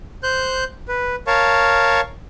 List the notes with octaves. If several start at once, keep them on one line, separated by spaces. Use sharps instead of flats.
C5 F#6 G6
B4
A#4 C#5 F5 A5 C#6